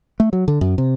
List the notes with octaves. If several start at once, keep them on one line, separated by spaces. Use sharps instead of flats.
A3
F#3
D3
F#2
C3